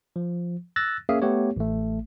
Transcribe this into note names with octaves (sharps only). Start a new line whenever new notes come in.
F3
E6 F#6 A6 A#6
A#3 C#4 G#4 E5 F5
A3 B3 G4 C#5
A1 A3